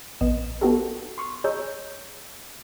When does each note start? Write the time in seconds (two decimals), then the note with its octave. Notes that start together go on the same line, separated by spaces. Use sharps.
0.21 A#1 B3 D#5 E7
0.61 B3 D#4 F#4 G4 A4 A#4
1.18 C6 C#6 F6
1.44 G#4 C#5 D#5 A#5 E6 G6